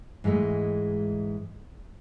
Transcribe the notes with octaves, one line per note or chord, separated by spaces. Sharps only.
G#2 E3 F#3 G#3 A3